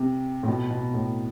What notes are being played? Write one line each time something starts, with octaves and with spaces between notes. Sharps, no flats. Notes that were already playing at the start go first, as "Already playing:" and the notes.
Already playing: C3
A2
B2
B2
A2